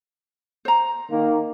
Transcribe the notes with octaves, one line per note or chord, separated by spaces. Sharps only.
C5 A#5
D#3 A#3